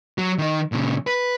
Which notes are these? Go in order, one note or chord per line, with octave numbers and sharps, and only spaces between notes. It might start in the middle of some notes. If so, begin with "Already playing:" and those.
F#3
D#3 D#4
A#2 C#3
B4